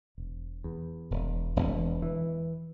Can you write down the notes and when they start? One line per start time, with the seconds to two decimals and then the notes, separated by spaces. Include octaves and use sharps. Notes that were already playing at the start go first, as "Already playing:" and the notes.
0.18 E1
0.64 E2
1.11 E1
1.56 E1
2.02 E3